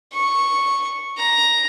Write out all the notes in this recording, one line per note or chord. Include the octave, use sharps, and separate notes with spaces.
C#6
A#5